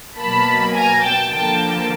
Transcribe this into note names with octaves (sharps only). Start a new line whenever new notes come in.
B2 F#3 A#3 A5 B5
G#5 A#5
G5 A5
D3 F3 A#3 G5 A5